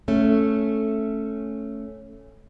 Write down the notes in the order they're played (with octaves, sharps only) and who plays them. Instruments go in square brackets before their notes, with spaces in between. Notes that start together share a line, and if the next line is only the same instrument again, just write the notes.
[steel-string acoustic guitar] A3 C#4